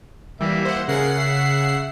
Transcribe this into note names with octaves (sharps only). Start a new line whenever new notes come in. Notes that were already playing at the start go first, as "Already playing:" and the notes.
E3 G3 A#3 E5
C5 F#5
C#3 G#4 A#4 F#5 C7
E5